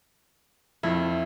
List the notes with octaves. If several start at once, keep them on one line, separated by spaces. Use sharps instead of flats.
F2 F3 E4